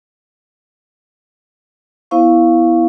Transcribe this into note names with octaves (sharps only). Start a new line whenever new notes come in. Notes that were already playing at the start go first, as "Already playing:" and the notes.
B3 E4 C5 F5 C#6